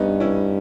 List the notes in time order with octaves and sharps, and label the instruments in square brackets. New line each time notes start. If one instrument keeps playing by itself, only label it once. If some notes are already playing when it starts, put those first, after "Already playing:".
Already playing: [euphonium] G2 [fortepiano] B3 C#4 D#4
[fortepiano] C#4 E4